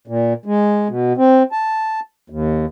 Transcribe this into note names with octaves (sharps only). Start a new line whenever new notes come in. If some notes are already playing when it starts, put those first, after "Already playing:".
A#2
G#3
B2
C4
A5
D#2